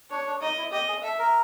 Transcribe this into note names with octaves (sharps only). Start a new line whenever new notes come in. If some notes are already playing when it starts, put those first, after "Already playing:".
D4 C#5
D4
D#4 D#5
E4
G4 D#5
G#4
A4 E5
A#4